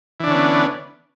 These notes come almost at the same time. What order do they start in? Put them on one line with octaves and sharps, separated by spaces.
E3 D4 D3 C#4 B3